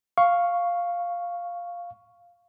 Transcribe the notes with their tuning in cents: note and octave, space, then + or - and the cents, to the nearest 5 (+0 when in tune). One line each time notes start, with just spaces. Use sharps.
F5 +0 C#6 +0